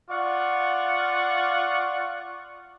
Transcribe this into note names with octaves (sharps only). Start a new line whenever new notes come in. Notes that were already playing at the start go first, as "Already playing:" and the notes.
F4 D5 F#5 C#6